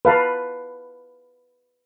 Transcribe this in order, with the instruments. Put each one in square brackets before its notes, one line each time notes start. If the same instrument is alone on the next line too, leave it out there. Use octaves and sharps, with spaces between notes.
[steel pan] B4 F5 A5